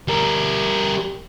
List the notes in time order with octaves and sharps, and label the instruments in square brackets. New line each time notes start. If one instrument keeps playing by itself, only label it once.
[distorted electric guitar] G3 A#4